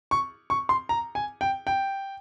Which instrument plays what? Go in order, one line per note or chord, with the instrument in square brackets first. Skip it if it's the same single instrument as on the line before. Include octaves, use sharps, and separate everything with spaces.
[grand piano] C#6
C#6
C6
A#5
G#5
G5
G5